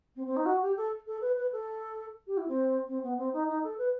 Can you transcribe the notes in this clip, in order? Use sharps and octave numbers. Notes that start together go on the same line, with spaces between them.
C4
C4
D#4
F#4
G4
A4
A4
B4
B4
A4
G4
E4
C4
C4
B3
C4
D#4
D#4
A4
B4